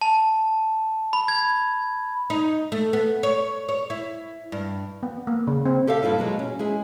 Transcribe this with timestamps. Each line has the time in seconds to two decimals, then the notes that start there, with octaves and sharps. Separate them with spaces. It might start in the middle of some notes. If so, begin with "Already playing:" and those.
0.01 A5
1.13 B5
1.28 G#6
2.30 D#4
2.72 A3
2.93 B3
3.23 C#5
3.69 C#5
3.90 E4
4.52 G2
5.03 B3
5.27 A#3
5.47 C#3
5.66 C4
5.87 G4 A4 E5 F5
6.03 G2 E4 F4 F5
6.18 B2 F#3 G#3
6.39 C#4
6.59 G#3 E4 G#4